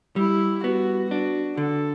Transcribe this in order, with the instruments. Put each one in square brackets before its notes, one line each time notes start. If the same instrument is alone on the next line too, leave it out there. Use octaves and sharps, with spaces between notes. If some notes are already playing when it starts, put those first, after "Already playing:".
[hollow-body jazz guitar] G3 [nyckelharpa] E4
[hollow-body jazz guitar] B3 [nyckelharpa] F#4
[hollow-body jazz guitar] D4 [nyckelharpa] F#4
[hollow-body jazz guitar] D3 [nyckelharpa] A4